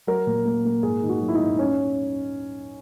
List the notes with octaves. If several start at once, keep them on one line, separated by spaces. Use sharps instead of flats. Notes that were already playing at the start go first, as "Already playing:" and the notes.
F#3 A#4
A#2
A#3
A#3
G#2 G#4
D#3
F#4
F#3
E4
D#4
G#2
C#4